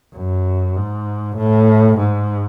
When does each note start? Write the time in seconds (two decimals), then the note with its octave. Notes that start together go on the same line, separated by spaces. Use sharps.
0.15 F#2
0.76 G#2
1.38 A2
1.99 G#2